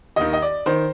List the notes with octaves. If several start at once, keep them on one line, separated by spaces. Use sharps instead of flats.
D#2 D#3 D#5
D#5
D5
D#3 C5